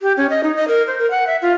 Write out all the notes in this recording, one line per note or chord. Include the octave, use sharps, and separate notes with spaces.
G4
C#4
D#5
D#4
D#5
A#4
C5
A#4
F#5
E5
F4